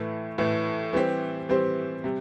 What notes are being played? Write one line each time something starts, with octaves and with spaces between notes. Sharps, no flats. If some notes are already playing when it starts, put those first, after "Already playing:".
Already playing: A2 E3 A3
A2 E3 A3
E3 G3 C4 G4 C5
E3 G3 C4 G4 C5
C3 G3